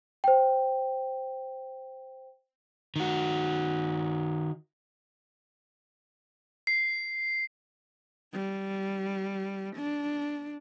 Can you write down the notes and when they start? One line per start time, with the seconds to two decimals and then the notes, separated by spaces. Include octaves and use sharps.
0.24 C5 G5
2.96 D#3 F#4
6.67 C7
8.33 G3
9.76 D4